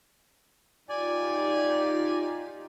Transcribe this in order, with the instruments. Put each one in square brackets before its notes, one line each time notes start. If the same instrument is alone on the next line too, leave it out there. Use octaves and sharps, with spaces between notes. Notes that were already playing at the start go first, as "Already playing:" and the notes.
[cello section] D#4 F4 G4 [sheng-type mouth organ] D5 G#5